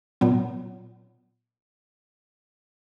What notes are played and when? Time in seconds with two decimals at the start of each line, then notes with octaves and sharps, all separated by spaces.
0.21 A#2 F#3 B3